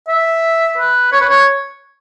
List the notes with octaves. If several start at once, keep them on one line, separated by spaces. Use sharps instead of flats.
E5
B4
C#5
B4
C#5